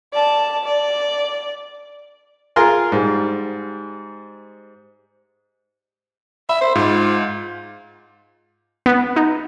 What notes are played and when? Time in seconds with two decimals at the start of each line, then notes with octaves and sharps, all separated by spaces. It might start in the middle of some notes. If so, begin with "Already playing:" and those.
0.13 D5 A5
0.65 D5
2.56 F4 G#4 A#4 A#5 C6
2.92 G#2 G3
6.49 E5 B5
6.61 C5
6.75 G#2 F4
8.86 B3
9.16 D#4